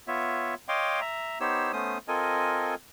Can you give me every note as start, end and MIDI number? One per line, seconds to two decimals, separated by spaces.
0.07 0.54 59
0.07 0.54 65
0.07 0.54 73
0.07 0.54 76
0.68 1.00 73
0.68 1.00 75
0.68 1.00 77
0.68 1.00 79
0.68 1.00 84
0.68 1.00 86
1.01 1.39 76
1.01 1.39 82
1.40 1.72 59
1.40 1.72 63
1.40 1.72 67
1.40 1.72 72
1.40 1.72 73
1.40 1.72 88
1.73 1.98 57
1.73 1.98 59
1.73 1.98 61
1.73 1.98 72
1.73 1.98 87
2.08 2.75 60
2.08 2.75 65
2.08 2.75 69
2.08 2.75 70
2.08 2.75 75
2.08 2.75 80